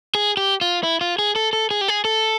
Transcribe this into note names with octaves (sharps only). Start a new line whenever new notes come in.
G#4
G4
F4
E4
F4
G#4
A4
A4
G#4
G4
G#4
A4